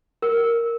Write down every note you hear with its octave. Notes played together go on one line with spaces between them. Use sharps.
A#4